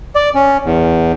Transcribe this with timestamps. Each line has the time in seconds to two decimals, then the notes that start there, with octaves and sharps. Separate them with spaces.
0.15 D5
0.35 C#4
0.65 E2